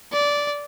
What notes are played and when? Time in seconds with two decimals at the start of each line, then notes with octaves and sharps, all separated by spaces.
0.13 D5